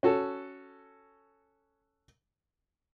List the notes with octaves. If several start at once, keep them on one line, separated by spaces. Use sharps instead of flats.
C#4 F#4 A4